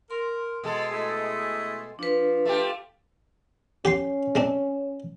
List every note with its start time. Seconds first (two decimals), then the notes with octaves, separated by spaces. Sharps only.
0.11 A#4 C6
0.64 B2 G#3 A4
0.91 A3 E4 G#4
1.99 F3 D4 B4
2.45 A3 F4 G4
3.85 C#4 G4 G5 C6
4.35 G#3 C4 D4